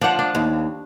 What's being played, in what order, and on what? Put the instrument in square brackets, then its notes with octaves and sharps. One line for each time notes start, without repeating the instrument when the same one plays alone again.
[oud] F3 [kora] D4 F#5
[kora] D4
[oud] D#2